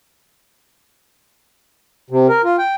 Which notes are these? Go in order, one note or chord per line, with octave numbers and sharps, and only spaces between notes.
C3
A#4
F4
G5